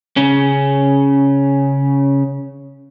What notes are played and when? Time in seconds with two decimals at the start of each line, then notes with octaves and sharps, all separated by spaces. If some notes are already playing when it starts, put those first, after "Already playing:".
0.17 C#3 C#4